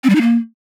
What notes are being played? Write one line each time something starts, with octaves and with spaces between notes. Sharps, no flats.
C4
G3
D#4
A#3